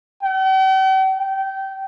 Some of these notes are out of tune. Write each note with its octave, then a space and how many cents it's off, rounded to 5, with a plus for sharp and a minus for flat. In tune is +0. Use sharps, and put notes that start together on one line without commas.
G5 -45
G5 -20